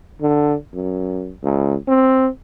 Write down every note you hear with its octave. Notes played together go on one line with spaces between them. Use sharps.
D3
F#2
C#2
C4